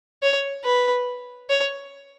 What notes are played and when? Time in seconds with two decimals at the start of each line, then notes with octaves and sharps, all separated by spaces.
0.23 C#5
0.65 B4
1.49 C#5